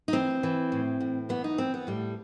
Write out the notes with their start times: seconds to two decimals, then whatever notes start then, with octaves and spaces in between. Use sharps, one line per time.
0.08 D#4
0.13 E3 C4
0.43 E3
0.72 A2
1.00 A2
1.29 E3 B3
1.44 D#4
1.58 E3 C4
1.74 B3
1.87 A2 G3